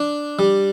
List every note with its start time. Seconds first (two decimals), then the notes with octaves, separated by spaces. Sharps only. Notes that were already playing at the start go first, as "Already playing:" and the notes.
Already playing: D4
0.39 G3